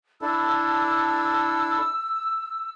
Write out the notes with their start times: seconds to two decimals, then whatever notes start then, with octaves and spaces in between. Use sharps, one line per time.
0.22 D4 E4 A4 E6